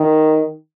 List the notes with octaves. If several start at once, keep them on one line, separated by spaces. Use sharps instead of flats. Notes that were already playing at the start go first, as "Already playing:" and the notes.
Already playing: D#3